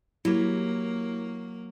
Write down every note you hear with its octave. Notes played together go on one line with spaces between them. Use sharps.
F#3 A#3 E4 G4